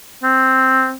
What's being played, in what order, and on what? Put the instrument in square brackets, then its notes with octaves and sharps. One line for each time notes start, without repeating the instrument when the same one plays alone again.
[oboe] C4